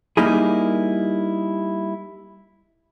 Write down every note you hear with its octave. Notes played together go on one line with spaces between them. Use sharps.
G3 A#3 D#4 E4 G#4